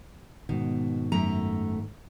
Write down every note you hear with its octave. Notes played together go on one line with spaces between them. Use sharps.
G#2 B2 D#3
F#2 A3 A#5